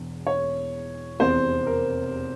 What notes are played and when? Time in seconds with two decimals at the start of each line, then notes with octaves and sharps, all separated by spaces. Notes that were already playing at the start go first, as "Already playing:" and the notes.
Already playing: E1 E2
0.27 C#5
1.19 F1 E2 C3 C5
1.66 A#4